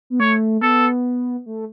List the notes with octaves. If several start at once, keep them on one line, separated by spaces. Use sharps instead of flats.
B3
A3 C#5
B3 A4
A3